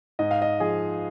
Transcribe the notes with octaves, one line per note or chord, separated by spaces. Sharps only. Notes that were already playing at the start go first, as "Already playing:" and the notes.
G#2 D#5
F5
D#5
F3 G#4